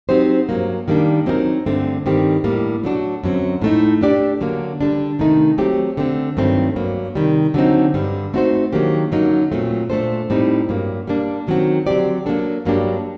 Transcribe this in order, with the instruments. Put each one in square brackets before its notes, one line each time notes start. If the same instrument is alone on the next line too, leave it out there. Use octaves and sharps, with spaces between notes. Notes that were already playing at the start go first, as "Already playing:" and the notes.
[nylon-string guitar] F#3 C4 D#4 G4 C5
G2 F#3 A#3
D#3 G3 A#3 D4
F#3 C4 D#4 G4 A#4
G2 D3 A3 C4
G2 D#3 G3 C4 G4
A2 G3 A#3
F#3 A3 D4 F#4
F#2 D3 F#3 C4
A2 A3 D#4
A3 D4 G4 D5
D3 F#3 A#3
D3 G3 D4
C3 D#3 A3 D#4
F#3 A3 C4 G4
D3 A3 C4
G2 D#3 F#3 A3 C4
G2 F#3 A#3
C3 D#3 G3
D3 F#3 C4 D#4
G2 D3 G3
A3 C4 D#4 F#4 C5
D#3 F#3 A#3 D4 G4
F#2 D3 F#3 A#3 D#4
A#2 F#3 A3 C4
A#2 A3 D4 A4 C5
A2 G3 C4 D#4
G2 F#3 A#3
G3 A#3 D4
F#2 D#3 F#3 C4 F#4
D3 F#3 C4 G4 D5
F#3 A#3 D4 A4
G2 F#3 A#3 D4 G4